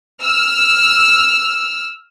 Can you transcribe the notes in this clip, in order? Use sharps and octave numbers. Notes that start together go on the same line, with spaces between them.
E6 F6